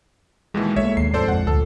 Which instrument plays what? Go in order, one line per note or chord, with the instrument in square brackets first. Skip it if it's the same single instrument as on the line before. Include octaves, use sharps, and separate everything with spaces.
[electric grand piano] D#2 B2 E3 [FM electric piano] G#3
[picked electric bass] B1 A3 A#3 [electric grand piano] C#5 E5
[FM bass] D#2 [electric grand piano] C7
[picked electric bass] G#2 C3 F3 [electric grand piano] A4 C5 D5
[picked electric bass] A#1 [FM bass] F2 [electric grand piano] F#5
[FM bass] D2 [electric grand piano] A4